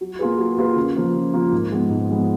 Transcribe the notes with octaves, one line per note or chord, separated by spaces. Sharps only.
F#3
A#3 F4 G#4 B4
F#3
A#3 F4 G#4 B4
C#3
F3 A#3 F4
C#3
F3 A#3 F4
G#2
F3 G#3 B3
G#2
F3 G#3 B3